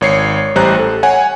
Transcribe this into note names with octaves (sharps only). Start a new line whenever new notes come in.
G#1 C#5 C7 C#7
A1 G3 C5 A#5 F#6
A4
C#5 F#5 G#5